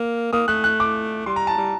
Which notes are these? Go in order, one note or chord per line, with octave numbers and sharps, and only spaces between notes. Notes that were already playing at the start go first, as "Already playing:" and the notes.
Already playing: A#3
A#3 D#6
A3 F#6
F#6
D6
G3 C6
A#5
A5
G3